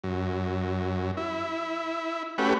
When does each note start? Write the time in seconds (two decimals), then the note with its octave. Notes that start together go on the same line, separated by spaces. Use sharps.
0.04 F#2
1.17 E4
2.38 A3 C#4 F#4 G4 B4